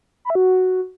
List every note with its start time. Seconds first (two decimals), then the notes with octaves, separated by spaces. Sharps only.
0.25 B5
0.30 E5
0.35 F#4